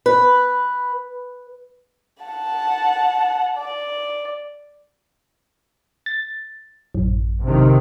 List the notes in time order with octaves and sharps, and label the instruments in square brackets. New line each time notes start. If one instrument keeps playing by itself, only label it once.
[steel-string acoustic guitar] B4
[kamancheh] F#5 A5
D5
[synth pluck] A6
A1 F#2
[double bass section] C3 D#3